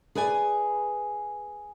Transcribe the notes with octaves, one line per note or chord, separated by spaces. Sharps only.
G#4 B4 D5 G#5